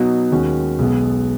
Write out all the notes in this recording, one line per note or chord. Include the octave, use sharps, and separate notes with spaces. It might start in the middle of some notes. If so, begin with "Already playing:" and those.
Already playing: B2 F#3 B3 D#4 F#4
D#2 D#3 G#3 C#4 F#4
B1 B2 G#3 B3